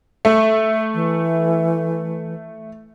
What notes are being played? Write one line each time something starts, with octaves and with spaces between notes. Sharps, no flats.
A3
E3